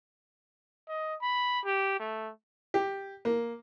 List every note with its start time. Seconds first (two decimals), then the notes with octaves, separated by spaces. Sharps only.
0.89 D#5
1.21 B5
1.65 G4
1.99 A3
2.74 G4
3.25 A#3